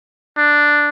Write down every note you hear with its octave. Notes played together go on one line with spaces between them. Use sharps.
D4